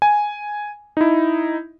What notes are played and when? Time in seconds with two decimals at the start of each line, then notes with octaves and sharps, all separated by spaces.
0.02 G#5
0.97 D#4 E4